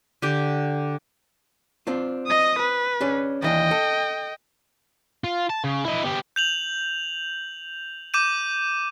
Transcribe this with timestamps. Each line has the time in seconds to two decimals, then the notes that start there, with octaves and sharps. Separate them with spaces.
0.22 D3 G4
1.87 C4 D4 F4
2.27 D#5 D#6
2.60 B4
3.01 C#4 D4 G#4
3.42 D#2 E3 D4 D#5 G5
3.71 A4
5.24 F4
5.50 A5
5.64 C#3
5.85 E4 D#5
6.03 B3 G4
6.36 G6 F7 F#7
8.14 D6 G6 D#7